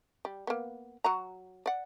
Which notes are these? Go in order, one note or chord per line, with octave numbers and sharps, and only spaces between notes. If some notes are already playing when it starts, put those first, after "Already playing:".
G3
A#3 B3
F#3 F#4 A#5
D5 F#5